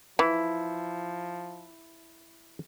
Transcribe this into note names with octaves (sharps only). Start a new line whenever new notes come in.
E3 F3 E4